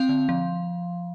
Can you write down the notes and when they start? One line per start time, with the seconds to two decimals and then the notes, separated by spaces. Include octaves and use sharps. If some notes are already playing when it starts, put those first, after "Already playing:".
Already playing: C4 F5
0.09 D3
0.29 F3